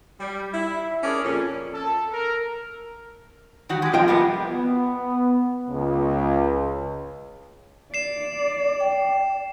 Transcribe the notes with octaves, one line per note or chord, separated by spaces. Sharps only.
G3
E4
C#4 G#4 A#4 D5
F2 A#2 C#4
A4
A#4
D#3 G3 F#4
G#3 G4
F3 F4 D#5 G5
G3 A#3 B3
B3
C#2
D5 C7 E7
G5